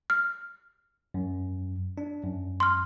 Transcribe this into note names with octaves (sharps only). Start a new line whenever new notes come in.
F6
F#2
D4
F#2
C6 F6